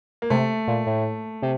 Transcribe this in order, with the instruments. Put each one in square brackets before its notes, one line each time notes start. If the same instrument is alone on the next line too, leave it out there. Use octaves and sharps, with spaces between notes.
[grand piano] A#3
[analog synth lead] C3 [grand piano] A3
[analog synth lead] A#2
A2
C3